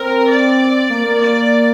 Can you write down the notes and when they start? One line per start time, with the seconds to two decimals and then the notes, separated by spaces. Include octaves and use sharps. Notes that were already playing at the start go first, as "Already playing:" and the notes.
Already playing: C4 A#4
0.30 D5
0.90 A#3
1.05 A#3
1.20 D5